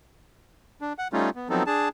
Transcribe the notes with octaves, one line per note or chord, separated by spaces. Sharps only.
D4
F#5
G3 A3 C#4 D#4 F4
B3
F3 F#3 B3 C4 D#4 A4
D4 G#4 A5